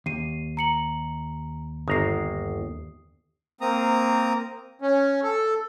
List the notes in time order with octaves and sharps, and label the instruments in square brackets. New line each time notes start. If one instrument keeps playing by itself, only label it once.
[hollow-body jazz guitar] D#2 [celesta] C7 D#7
[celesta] A#5 C#7 F#7
[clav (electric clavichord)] G1 A#5 [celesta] D#6 C7
[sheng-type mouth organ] A#3 C4 A#5 D#6
[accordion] C#4
A4